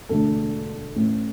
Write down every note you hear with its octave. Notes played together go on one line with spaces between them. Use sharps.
E1 D2 D3 A3 A4
A1 A2 E3